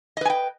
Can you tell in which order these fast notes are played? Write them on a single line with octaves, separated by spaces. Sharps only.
D#5 B4 G#5 G5